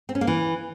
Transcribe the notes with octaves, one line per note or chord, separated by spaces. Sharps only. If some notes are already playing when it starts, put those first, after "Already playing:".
C4
C#4
A#3
E3